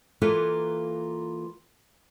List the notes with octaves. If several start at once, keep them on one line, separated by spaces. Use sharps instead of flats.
E3 A#3 E4 F4 A4 B4